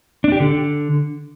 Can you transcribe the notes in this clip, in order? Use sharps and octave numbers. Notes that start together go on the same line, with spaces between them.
D4
G4
D3